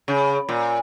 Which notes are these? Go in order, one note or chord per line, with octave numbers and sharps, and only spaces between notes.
C#3
A#2